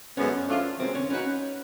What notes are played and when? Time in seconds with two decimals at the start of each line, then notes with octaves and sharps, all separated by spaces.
0.17 F#2 D3 F3 G#3 B3 C#4
0.48 F3 A3 D4 F4
0.79 F#2 D#3 G#3 C4
0.95 C#4
1.10 A#3 C#4 D#4 F#4 B4